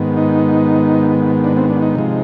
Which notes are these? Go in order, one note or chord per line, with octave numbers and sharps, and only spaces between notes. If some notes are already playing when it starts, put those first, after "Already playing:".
Already playing: G#2 D#3 B3
D#4
D4
C4
D4
D#4
C3 F3 G#3